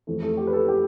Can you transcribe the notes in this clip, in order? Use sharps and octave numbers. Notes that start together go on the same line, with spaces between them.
F2 E3 A3
A3
G4
B4
A4
G4